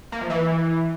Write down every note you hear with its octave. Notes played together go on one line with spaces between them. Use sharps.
A#3
F3
E3